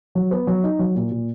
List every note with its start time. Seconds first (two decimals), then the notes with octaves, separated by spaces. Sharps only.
0.15 F#3
0.31 B3
0.47 F#3
0.63 D#4
0.79 F#3
0.95 A#2
1.11 A#2